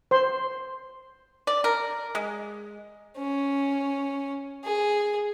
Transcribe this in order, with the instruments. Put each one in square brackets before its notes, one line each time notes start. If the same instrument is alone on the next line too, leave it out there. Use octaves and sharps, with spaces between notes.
[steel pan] C5 C6
[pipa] D5
A#4
G#3
[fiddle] C#4
G#4